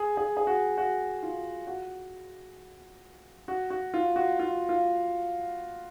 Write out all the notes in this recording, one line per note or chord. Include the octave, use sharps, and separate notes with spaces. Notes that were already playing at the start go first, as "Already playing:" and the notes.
Already playing: G#4
G#4
G#4
F#4
F#4
F4
F#4
F#4
F#4
F4
F#4
F4
F4